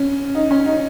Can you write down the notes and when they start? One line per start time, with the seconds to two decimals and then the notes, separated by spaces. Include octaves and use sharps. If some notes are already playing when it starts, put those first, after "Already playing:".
Already playing: C#4
0.35 D#4
0.51 C#4
0.66 D#4